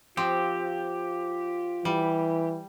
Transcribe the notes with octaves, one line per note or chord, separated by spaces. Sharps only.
F3 C4 F4 G4
E3 G3